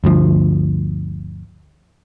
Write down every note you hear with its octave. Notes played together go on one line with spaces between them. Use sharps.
G1 D2 F3